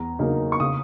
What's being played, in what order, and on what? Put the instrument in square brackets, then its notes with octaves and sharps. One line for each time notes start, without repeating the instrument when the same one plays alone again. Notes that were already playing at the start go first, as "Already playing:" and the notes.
Already playing: [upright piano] E2 A#5
C#3 F#3 A#3 D#4
C#6
C#3 D#6